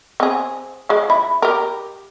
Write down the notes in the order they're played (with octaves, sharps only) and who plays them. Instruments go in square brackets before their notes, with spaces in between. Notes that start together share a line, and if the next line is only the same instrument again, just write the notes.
[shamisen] C4 G#4
F3 G#3
[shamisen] E4 [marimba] B5
[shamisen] G4 A#4